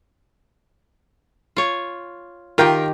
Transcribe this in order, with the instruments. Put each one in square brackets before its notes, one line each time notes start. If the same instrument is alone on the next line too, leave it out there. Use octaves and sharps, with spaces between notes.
[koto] F4 C#5
[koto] D#3 G4 [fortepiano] F4 A#4 G5